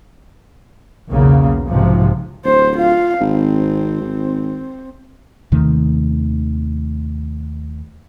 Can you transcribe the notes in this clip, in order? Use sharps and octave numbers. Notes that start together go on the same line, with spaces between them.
B1 E2 C#3 A#3
B1 G#2 C3 F3
D1 C5
F4 F5
G#1 C4
G#1
D#2 C3 D#3 A3